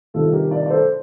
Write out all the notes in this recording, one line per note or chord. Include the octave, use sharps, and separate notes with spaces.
C3 D#3 G3 F4 A4
G4 A#4
A#4 D5
D5
A4 C5